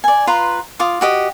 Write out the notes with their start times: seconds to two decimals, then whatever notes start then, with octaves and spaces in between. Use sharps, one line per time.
0.04 D5 G#5
0.27 F4 B4 A#5 C6
0.79 F4 D6 D#6
1.01 F#4 G4 D#5